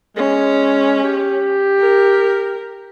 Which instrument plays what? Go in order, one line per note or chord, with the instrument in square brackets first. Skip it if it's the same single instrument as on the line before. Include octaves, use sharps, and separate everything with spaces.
[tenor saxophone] G#3 [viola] C#4
[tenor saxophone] G4
[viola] A#4